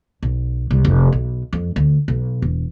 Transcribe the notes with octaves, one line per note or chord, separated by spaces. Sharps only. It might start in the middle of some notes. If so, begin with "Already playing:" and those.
B1
C2
F1
B1
F2
D2
B1
E1